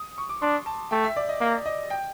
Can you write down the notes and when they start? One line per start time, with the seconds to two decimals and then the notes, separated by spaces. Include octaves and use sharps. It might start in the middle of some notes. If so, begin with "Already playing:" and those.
Already playing: D#6
0.18 C#6
0.29 D6
0.42 D4 C6
0.66 A5
0.91 A3 G5
1.04 E5
1.16 D5
1.29 D#5
1.41 A#3
1.66 D#5
1.90 G5